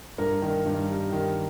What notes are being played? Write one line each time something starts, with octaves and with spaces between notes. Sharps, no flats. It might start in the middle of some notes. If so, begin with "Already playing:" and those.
G2 A#4
D#3
G2
G3
D#3